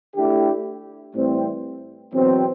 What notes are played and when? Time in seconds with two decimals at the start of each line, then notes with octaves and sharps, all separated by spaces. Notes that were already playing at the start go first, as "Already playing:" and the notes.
0.16 D2 D3 A3 E4 G4
1.14 A2 E3 G3 C4
2.12 E2 B2 F#3 C4